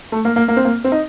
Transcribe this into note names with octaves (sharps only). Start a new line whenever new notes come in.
A3
A#3
A#3
A#3
C4
A#3
C4
D#4